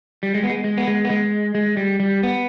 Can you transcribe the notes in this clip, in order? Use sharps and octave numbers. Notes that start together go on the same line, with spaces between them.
G3
G#3
B3
G#3
G#3
B3
G#3
B3
G#3
G#3
G3
G3
B3